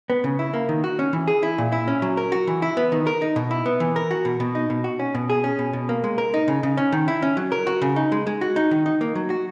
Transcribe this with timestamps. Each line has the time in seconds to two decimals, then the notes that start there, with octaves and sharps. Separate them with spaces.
0.10 B3
0.24 C#3
0.39 E4
0.54 A#3
0.69 D#3
0.84 F#4
0.99 C#4
1.13 E3
1.28 G#4
1.43 E4
1.58 A#2
1.72 E4
1.88 C#4
2.02 F#3
2.17 A#4
2.32 F#4
2.47 E3
2.62 E4
2.77 B3
2.92 D#3
3.07 A#4
3.22 D#4
3.36 B2
3.51 E4
3.66 B3
3.80 E3
3.96 A#4
4.11 F#4
4.25 B2
4.40 B2
4.55 D#4
4.70 B2
4.84 F#4
4.99 C#4
5.15 B2
5.30 G#4
5.44 C#4
5.59 B2
5.73 B2
5.89 A#3
6.04 G#3
6.18 A#4
6.34 D#4
6.48 C#3
6.63 C#3
6.77 C#4
6.92 D#3
7.08 E4
7.22 C#4
7.37 F#3
7.52 A#4
7.67 F#4
7.82 C#3
7.96 D#4
8.12 G#3
8.27 G#3
8.41 F#4
8.56 D#4
8.71 D#3
8.86 D#4
9.01 A#3
9.15 F#3
9.30 F#4